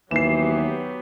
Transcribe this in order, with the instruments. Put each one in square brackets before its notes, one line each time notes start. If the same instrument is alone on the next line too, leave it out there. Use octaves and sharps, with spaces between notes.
[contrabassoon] D#2 [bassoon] E3 [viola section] F#3 B3 G4 [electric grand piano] C7 E7